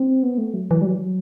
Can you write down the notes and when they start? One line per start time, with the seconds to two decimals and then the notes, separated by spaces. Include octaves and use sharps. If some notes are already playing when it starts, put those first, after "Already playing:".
Already playing: C4
0.23 B3
0.38 A3
0.54 F#3
0.71 E3
0.81 G3
0.85 F#3